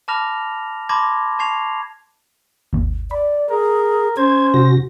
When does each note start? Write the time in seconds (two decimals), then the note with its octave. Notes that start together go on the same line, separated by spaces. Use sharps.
0.08 A5 B5 D6 F6 A#6 F7
0.89 A5 B5 C6 D6 G#6 A#6
1.39 A5 C#6 G#6 C7 F7
2.73 G#1 D#2
3.11 D5 B5
3.50 G#4 A#4
4.17 C#4 C5 G#6
4.54 C3 F#4 A#6